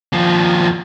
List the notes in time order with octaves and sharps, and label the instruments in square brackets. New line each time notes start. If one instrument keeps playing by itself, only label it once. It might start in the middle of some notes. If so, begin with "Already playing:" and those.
[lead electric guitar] D#2 F3